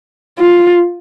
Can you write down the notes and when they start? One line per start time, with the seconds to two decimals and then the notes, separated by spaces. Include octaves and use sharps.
0.39 F4